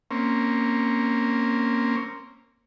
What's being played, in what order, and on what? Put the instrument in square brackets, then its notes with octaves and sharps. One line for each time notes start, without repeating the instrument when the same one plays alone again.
[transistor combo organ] A#3 C4 C#4